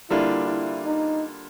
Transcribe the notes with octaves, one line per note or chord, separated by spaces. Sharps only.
D3 G3 A#3 D4 E4 F4
E4
D#4